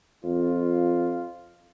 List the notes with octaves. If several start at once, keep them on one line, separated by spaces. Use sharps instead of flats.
F2 F4